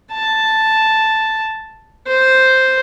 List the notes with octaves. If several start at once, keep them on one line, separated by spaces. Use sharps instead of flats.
A5
C5